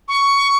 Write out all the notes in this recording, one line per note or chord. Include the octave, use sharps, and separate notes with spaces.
C#6